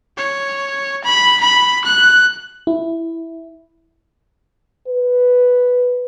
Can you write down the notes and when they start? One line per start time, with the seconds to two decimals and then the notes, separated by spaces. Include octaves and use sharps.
0.17 C#5
1.04 B5
1.41 B5
1.85 F#6
2.67 E4
4.88 B4